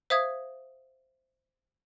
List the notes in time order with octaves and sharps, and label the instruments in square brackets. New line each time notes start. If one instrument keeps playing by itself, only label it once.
[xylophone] C5 E5 F5 D#6 G#6